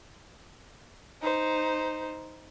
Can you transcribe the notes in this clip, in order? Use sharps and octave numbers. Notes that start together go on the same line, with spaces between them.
D#4 C5